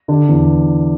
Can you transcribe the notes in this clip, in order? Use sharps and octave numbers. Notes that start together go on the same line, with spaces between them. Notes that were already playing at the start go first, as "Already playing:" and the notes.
D3
E2